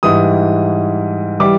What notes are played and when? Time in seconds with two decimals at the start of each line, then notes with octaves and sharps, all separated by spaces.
0.03 G#2 E3 G3 D#6
1.40 E3 G3 D6